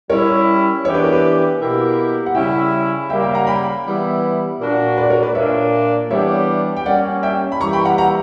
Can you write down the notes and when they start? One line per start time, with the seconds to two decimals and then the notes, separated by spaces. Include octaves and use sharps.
0.09 G3 C#4 E4 A#4 C#5
0.85 E3 B3 D4 G4 C#5
0.94 B4
1.04 A#4
1.13 B4
1.59 B2 A#3 E4 G4
2.26 F#5
2.35 C#3 G3 C#4 E4 E5 G5
3.09 C#3 G3 A#3 E5 G5
3.23 E5 G5
3.35 F#5 A#5
3.47 G5 B5
3.85 E3 G3 B3 E4
4.60 A#2 A#3 D4 F#4
4.97 B4 D5
5.10 A#4 C#5
5.23 B4 D5
5.35 A#2 A#3 D4 C#5 E5
6.10 E3 G3 B3 D4 G4 C#5 E5
6.77 G5
6.85 G3 A#3 C#4 D5 F#5
7.23 E5 G5
7.52 B5
7.61 E3 G3 A#3 E4 G4 A#5 C#6
7.73 G5 B5
7.85 F#5 A#5
7.98 F#5 A#5